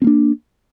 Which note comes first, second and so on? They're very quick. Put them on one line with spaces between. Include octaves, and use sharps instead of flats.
C4 A#3 D4